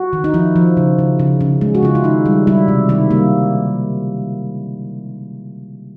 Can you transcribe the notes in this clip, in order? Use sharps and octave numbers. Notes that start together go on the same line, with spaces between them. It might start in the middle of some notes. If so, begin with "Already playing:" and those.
Already playing: F#4
D#3
D#4
F3 E4
F3
C#3
C#3
C#3
C#3
G#3
F#4
C#3 F4
E4
D#3 D#4
G3
G3 E4
C3
D#3 E4
G3 A#3